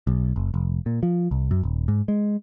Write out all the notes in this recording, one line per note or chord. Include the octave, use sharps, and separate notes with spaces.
B1
F#1
F1
A#2
F3
C2
F#2
D#1
G#2
G#3